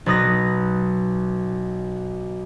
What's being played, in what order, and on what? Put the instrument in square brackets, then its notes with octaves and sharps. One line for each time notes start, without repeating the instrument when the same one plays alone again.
[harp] B1 B4 D#6 A#6